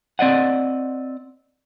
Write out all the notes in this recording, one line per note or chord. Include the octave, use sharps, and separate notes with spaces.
C4 D5 D#5 F#5